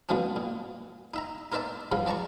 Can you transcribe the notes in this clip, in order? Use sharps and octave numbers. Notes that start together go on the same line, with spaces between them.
D2 B2 F3 F#3 C#4 D4
A#2
D#4 E5 A#5
D#4 A#4 C5 D5 E5 A5
G2 C#3 F3 F5
F3 D5 A5 A#5 C#6